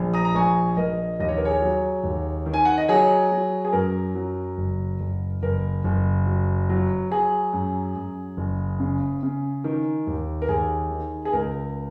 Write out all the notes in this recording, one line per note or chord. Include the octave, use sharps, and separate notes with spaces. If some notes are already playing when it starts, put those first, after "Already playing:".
Already playing: A#1
A#5 D#6
A#5
A#1 G#5 C#6
A#1 A#4 D#5
D#2 D#5
C#5
A#4
G#4 C#5
F#3
D#2
D#3
G#5
F#5
D#5
F#3 G#4 C#5
F#3
G#4
F#2 A#4
F#3
F#1
F#1
F#1 A#4
F#1
F#3
F#3
F#3 G#4
F#2
F#2
F#1
C#3
C#3
D#3
D#2
A#4
D#2 G#4
D#3
G#4
C#2 A#4